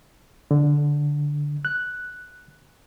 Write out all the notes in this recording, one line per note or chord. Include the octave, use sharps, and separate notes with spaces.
D3
F#6